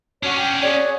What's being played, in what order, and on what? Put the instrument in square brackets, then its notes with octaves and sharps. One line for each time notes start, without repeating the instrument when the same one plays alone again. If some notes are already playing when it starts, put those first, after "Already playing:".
[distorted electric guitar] C#4 D4 [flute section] F#4 C#5
[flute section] G5
[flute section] F#4 G#4 C#5 [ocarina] D5